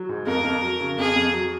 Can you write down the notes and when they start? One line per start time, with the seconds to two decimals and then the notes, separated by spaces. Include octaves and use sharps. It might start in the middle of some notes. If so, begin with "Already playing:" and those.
Already playing: F#3
0.09 G#2
0.26 F2 A#4
0.44 F2
0.62 F#3
0.80 C#3
0.98 F2 G#4
1.16 F2
1.34 F#3